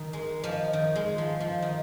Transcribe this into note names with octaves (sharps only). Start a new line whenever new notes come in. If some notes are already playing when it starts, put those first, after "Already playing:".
Already playing: D#3
G#3 A#4
F3 D#5
D#3
G#3
F3
F3
D#3